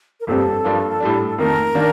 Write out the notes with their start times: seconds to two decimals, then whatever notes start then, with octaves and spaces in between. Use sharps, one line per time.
0.20 A#4
0.27 G1 F2 C3 G3 C4 A4
0.64 G2 F3 A#3 D4
1.00 A2 G3 D4
1.38 F2 D#3 A3 A#4
1.75 D#3 A#3 D4